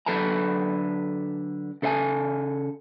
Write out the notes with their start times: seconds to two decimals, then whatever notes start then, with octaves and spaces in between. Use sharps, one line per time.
0.06 D3 F#3 A4 B4 A5 A#5
1.82 C#3 A4 C5 E5 G#5 A5